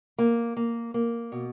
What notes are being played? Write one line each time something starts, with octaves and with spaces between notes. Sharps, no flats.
A#3
A#3
A#3
B2